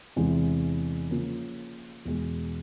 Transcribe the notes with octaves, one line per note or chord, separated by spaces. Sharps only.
E2 C3 E3 G#3
C#3 F3 A#3 C#4
E2 B2 G#3